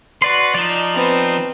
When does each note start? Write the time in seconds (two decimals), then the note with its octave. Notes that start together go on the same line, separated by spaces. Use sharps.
0.22 F#4 B4 D5 C6
0.54 F3 D#4 D5
0.94 B3 C4